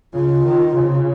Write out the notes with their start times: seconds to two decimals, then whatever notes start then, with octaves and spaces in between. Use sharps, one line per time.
0.14 C#3 F4
0.44 D#3
0.74 C#3